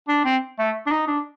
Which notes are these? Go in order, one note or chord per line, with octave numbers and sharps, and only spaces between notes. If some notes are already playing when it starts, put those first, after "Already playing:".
D4
C4
A3
D4
D#4
D4